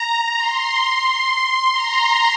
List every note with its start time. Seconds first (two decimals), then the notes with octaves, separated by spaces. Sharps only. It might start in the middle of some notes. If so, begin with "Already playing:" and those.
Already playing: A#5
0.36 C6
1.72 A#5